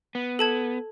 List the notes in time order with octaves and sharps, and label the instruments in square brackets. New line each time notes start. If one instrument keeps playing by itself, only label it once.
[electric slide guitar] B3
[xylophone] A4 A5 G#6